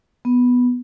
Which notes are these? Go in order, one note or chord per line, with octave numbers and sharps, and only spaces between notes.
B3